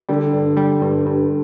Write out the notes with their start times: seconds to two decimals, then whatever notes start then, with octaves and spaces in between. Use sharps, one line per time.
0.09 D3 G3
0.33 G2
0.57 G3
0.81 G2
1.06 G2